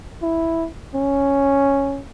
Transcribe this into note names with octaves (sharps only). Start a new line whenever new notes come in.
E4
C#4